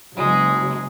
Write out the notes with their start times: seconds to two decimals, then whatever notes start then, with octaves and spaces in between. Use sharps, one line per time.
0.16 F#1 F#3 G#3